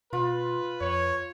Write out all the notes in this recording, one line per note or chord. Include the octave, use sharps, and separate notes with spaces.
B2 F4 B4
F2 C#5